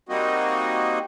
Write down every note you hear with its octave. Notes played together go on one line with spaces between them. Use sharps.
G3 A#3 C4 D#4 F#4 D#5